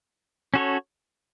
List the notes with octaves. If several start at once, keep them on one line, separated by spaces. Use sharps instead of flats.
C#4 F#4 A4 C#5